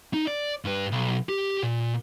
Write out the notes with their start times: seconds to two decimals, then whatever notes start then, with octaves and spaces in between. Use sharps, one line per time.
0.14 D#4
0.27 D5
0.65 G2 B4
0.92 B1
1.29 G4
1.63 A#2